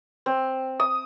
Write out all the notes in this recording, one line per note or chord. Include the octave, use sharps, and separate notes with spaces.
C4
D#6